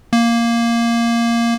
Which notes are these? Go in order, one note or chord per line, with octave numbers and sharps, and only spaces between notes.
A#3